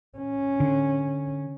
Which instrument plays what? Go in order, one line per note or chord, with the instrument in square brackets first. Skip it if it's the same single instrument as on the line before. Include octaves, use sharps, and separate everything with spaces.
[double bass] C#4
[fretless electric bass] D3